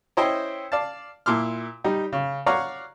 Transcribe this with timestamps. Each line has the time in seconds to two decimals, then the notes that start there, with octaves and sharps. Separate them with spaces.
0.17 C#4 E4 C5 D#5 G5
0.72 D5 F5 A5
1.26 A#2 E4 C6 D6 F6
1.84 G3 D#4 G4
2.12 C#3
2.46 C#5 D5 F5 F#5 A#5 C#6